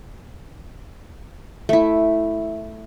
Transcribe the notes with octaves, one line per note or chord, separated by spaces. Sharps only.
A3 E4